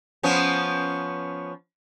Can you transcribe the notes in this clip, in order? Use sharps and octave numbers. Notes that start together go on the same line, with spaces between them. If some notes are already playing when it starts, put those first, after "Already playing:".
F3 B3 C#4